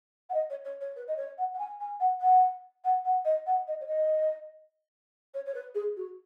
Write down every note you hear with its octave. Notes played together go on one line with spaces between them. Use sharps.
F#5
D#5
C#5
C#5
C#5
B4
D#5
C#5
F#5
F#5
G#5
G#5
F#5
F#5
F#5
F#5
D#5
F#5
D#5
C#5
D#5
C#5
C#5
B4
G#4
F#4